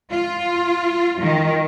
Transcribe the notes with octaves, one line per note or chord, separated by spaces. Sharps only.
F4
D#3